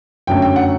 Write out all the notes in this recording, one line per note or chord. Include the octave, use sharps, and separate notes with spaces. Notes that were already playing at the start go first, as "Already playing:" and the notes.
F#2 D3 F#3 A3 C#4 G5
G5
F#5